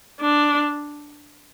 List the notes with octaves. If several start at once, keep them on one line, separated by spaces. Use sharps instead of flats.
D4